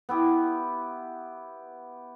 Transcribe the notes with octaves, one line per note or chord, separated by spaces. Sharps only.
B3 E4 G4